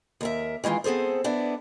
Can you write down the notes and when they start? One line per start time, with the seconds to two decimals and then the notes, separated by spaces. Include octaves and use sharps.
0.21 D#2 A#4 E5
0.64 D#3 E3 G#3 F4
0.84 B3 C4 G#4 A4 C5
1.24 B3 D4 E4